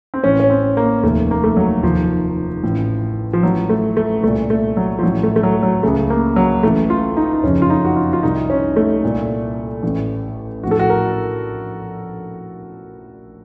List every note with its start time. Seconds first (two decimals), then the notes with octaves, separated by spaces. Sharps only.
0.14 C4
0.23 A1 A2 C#4
0.40 C#4
0.50 C4
0.77 A#3
1.03 F1 D#2 D#3 A3
1.31 A#3
1.44 A3
1.57 F#3
1.83 F1 D#2 D#3 F3
2.63 A1 A2
3.33 F3
3.43 A1 A2 F#3
3.69 A3
3.97 A3
4.23 C2 A#2 A3
4.50 A3
4.77 F#3
4.99 F3
5.03 A1 A2 F#3
5.23 A3
5.36 A3
5.43 F#3
5.63 F#3
5.83 C#2 C#3 A3
6.10 A#3
6.36 F#3
6.63 A1 A2 A3
6.90 F4
7.17 D#4
7.43 F#1 F2 C#3 C#4
7.62 F4
7.70 D#4
7.84 F#4
7.96 F4
8.13 F4
8.23 C2 C3 D#3 D#4
8.50 C#4
8.76 A3
9.03 C2 A#2
9.83 A1 A2
10.63 A#1 F#4
10.67 A2 A4
10.79 F#4
10.90 A#4